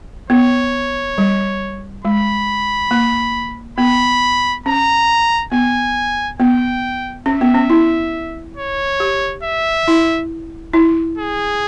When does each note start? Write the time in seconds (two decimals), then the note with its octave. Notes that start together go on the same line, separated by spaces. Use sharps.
0.30 B3 C#5
1.18 G3
2.04 G#3 B5
2.91 A#3
3.78 B3 B5
4.66 C#4 A#5
5.52 B3 G#5
6.40 B3 G5
7.26 C#4 E5
7.41 B3
7.55 C#4
7.70 E4
8.57 C#5
9.00 G4
9.43 E5
9.88 E4
10.73 E4
11.18 G#4